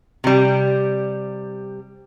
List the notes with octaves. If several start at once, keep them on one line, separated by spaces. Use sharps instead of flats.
C3 G3